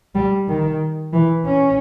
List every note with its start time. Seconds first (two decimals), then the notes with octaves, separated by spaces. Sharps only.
0.15 G3
0.48 D#3
1.13 E3
1.46 C#4